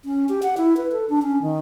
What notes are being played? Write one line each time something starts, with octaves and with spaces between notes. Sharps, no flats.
C#4
G4
F#5
E4
B4
A4
D4
C#4
D#3